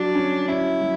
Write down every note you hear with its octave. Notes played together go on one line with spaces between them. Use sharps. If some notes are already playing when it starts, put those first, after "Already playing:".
Already playing: F#3 D4
C#4
C#4 E4
F#3